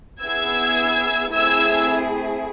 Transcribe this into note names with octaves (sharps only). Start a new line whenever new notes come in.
B3 E4 G#4 E6 G#6
A3 C4 E4 G#4 E6 G#6